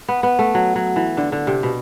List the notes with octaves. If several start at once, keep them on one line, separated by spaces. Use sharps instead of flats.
B3
B3
A3
F#3
F#3
E3
D3
D3
C3
B2